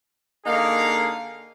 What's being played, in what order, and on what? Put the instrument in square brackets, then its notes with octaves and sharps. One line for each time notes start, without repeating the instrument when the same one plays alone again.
[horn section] D3 A#3 D#4 G#4 F5